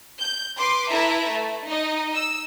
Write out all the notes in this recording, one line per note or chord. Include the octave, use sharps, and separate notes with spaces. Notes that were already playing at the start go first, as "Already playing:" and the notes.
G6
B4 C6 D6
E4 A4 B4 E5 A#5
A3
D#4 D#5
E6